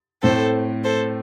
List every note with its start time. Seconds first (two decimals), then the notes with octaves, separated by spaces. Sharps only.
0.23 A2 A3 C4 A4 C5
0.84 A4 C5